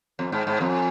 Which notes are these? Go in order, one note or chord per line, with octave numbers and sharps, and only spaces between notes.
F2
G#2
G#2
F2